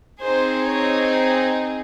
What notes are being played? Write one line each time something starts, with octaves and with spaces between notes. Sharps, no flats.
C4 D#4 G#4 C5
C#5